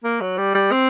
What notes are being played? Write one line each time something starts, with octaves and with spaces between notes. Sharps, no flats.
A#3
F#3
G3
G3
C4